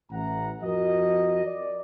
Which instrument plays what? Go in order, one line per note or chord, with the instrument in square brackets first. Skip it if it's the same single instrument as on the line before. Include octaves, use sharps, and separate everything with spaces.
[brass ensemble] A1 E3 F#5 A#5
F2 F3 F#4 A#4 D#5
D5